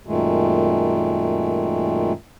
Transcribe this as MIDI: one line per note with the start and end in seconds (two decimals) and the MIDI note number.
0.06 2.12 42
0.06 2.12 46
0.06 2.12 51
0.06 2.12 56
0.06 2.12 57